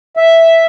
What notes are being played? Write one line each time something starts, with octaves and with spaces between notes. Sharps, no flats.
E5